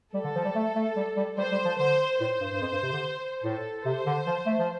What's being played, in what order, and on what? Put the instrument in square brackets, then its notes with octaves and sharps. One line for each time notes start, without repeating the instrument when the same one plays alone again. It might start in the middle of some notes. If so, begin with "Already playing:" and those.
[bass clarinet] G3 [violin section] A4
[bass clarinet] D3
F3
G3
A3
A3
G3
G3
[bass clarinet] G3 [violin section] C5
[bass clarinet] G3
F3
[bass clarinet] D3 [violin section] C5
[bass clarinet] A2 [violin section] C5
[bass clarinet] G2
G2
F2
G2
C3
D3
[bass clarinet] A2 [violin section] A4
[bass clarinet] C3 [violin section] C5
[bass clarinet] D3
F3
A3
F3